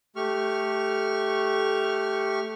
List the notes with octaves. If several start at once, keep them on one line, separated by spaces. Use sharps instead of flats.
A3 G4 C#6 F6